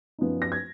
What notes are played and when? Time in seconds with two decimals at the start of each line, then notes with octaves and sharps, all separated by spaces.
0.18 F#2 F3 B3 D#4
0.42 A#6
0.52 G#6